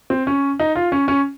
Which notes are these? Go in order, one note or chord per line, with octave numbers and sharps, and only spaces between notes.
C4
C#4
D#4
F4
C#4
C#4